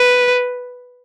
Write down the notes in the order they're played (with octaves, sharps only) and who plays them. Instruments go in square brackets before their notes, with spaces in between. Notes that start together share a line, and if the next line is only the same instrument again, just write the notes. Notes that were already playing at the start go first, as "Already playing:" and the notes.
Already playing: [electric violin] B4